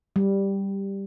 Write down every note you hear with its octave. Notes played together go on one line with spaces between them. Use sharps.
G3